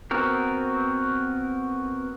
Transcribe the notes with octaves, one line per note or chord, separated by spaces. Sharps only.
B3 C4 F#4 A#4